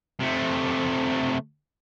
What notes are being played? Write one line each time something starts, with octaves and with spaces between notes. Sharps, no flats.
C3 A3